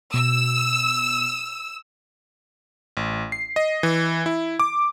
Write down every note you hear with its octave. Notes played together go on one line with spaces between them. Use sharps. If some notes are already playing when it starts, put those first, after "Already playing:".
B2 E6
A1
C7
D#5
E3
E4
D6